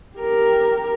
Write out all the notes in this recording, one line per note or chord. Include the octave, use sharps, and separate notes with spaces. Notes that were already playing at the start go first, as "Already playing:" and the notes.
G4 A#4